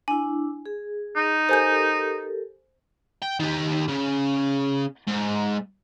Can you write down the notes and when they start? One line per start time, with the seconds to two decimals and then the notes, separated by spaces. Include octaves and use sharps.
0.08 D4 E4 G#5
0.66 G#4
1.16 D#4
1.49 G4 A4 A#4 C5 G#5 G6
3.22 G5
3.40 D#3 G4
3.88 C#3
5.08 G#2